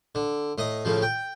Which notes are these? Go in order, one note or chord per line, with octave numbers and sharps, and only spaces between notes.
D3
A2 D#5 D#6
A2 C#3 F3
G5